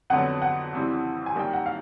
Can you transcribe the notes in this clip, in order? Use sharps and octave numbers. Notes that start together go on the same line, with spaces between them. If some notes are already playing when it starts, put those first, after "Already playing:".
F2 D3 F#3 B3 F#5
F#5
F2 C#3 E3 G3 C4
G#5
F#2 D#3 G3 A#3 G5
F#5
F5